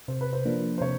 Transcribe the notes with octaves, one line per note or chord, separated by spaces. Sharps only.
C3 C5
B4
C5
F3 A#3 D4
C5
C3 C#5